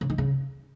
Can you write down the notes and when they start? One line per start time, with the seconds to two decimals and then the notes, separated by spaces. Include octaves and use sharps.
0.01 C#3
0.10 D#3
0.18 C#3